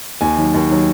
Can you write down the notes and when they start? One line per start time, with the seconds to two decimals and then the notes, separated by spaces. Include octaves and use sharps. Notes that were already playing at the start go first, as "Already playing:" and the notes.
0.21 D#2 G#5
0.38 D#3 F#3
0.54 D#2
0.70 D#3 F#3